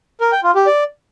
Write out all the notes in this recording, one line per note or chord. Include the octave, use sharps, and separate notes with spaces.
A#4
G5
F4
G4
D5